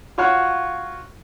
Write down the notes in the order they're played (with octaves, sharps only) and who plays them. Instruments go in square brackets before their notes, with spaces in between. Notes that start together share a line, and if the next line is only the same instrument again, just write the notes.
[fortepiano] F4 F#4 C#5 F5 F#5